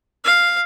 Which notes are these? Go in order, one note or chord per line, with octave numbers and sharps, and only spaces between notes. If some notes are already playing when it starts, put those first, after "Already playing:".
F5